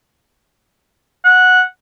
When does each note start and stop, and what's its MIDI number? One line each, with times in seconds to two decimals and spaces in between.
1.24 1.61 78